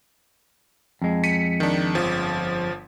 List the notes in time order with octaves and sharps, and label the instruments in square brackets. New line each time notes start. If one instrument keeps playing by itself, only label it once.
[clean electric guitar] F2 G#3
[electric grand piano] B6 C#7 D#7
D#3 D4
G1 F3